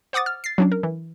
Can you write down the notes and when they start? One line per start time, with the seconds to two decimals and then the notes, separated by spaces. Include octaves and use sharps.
0.13 C5 F#5 D6 D#6 A6
0.26 F6
0.44 A6 C7
0.58 F#3 C#4 D4
0.72 A#4
0.83 E3